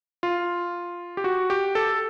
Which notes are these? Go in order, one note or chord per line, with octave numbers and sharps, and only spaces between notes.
F4
G4
F#4
G4
A4